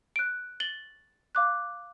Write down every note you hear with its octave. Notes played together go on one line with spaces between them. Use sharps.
F#6 D7
A6 F#7 G7
F5 D6 F#6